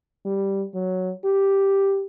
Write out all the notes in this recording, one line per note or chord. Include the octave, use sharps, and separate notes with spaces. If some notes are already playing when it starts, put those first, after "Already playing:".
G3
F#3
G4